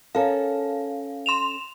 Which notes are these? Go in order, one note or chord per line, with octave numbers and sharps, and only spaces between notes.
C#4 A4 A#4 F5
C6 E7 F7